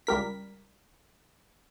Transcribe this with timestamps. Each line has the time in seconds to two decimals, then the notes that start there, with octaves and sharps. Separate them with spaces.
0.07 C#2 G3 A#4 B6